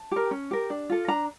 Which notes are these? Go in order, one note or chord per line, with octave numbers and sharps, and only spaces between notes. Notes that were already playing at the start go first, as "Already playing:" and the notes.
Already playing: A5
G4 A#4
C#4
G4 A#4
D4
F4 A4
D4 A#5